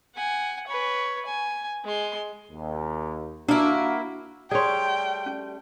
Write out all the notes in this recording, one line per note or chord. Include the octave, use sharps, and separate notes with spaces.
F#5 G#5
B4 C#5
G#5
G#3 C6
D#2
A#3 D4 E4 F#4 E6
G3 A3 G#4 C#5 D5 G5 C6
C#4